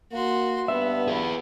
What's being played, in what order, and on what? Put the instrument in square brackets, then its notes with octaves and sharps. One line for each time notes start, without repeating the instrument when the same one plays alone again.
[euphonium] A#3 [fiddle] F#4 C6
[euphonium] G2 [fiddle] B3 [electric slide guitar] E5
[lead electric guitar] G#4 B4